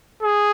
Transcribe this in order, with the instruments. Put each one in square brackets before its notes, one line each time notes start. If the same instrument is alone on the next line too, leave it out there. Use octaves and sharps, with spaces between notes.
[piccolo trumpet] G#4